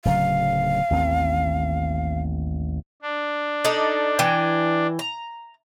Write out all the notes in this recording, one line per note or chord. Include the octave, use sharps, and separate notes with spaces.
D1 C#3 F#3 F5
A1 D#2 C4
D4
D#4 A4 D5
E3 G5
A#5